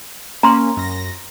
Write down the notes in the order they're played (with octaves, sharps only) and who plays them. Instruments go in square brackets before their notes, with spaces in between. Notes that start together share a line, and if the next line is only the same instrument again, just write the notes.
[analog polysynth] A#3 C#4 [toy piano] A#5 C6
[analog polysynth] F#2 A#6